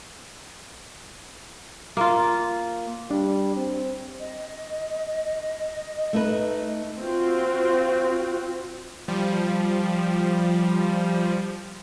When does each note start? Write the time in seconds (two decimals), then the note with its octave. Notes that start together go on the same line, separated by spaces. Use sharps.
1.97 A#3 F4
3.11 G3 D4
3.57 C4
4.19 D#5
6.13 A3 D#4 B4
6.99 C4 F4 F#4
9.08 F3 G3